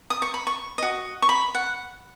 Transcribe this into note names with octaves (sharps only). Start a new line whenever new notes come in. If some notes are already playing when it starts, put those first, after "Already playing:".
D#6
C#6
B5
C#6
F#4 D#5
C#6
B5
F#5